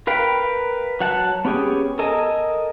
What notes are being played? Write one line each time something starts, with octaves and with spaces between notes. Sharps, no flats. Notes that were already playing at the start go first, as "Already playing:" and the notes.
A#4 B4 F5 G5
F#3 F#5 A5
B3 C#4 G4 G#4
A4 A#4 D#5 G#5